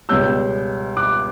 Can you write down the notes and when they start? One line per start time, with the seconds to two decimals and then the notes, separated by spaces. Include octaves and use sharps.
0.09 C#2 B2 G3 C#4 E6 G6
0.97 D6 F#6